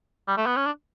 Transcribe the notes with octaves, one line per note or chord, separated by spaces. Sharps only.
G3
A3
B3
C#4
D4